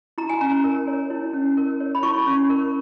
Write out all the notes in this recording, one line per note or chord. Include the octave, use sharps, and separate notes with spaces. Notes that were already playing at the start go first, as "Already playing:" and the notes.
E4 A#5
G#5
C#4 A#5
A#4
C#5
E4
C#4
A#4
C#5
B5
E4 C#6
C#4
A#4